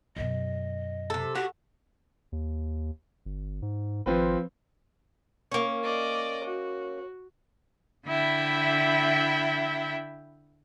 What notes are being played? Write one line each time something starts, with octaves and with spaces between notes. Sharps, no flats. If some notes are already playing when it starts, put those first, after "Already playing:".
F#2 B2 D#5
C3 A4
F#4 G4
D#2
G1
G#2
G#1 F3 C4 B4
A#3 C#4
D5 D#5 D6
F#4
D3 E4 E5 G5 B5